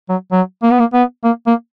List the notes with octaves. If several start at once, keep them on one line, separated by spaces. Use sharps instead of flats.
F#3
F#3
A#3
B3
A#3
B3
A#3
A#3